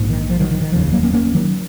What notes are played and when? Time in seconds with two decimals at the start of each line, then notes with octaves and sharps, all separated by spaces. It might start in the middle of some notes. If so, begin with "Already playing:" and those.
Already playing: A#1 G#2
0.10 D#3
0.30 F3
0.40 D#3 F#3
0.51 D#3
0.61 D#3
0.72 F1 D#2 C#3 F3
0.92 F#3 A#3
1.03 A#3 C#4
1.13 A#3 C#4
1.35 D#3 F#3